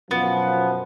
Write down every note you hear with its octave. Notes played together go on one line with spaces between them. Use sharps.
F#2 B2 F3 B3